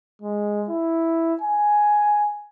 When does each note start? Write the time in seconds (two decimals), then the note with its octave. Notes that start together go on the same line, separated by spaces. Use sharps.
0.22 G#3
0.69 E4
1.42 G#5